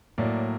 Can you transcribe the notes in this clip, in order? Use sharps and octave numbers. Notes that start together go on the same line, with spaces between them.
A2 F#3 A#3 D5